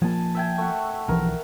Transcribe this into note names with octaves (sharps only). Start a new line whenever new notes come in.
F3 A#3 G#5 A5
E5 G5 G#5
A3 F#4
B1 E3 F3 A#4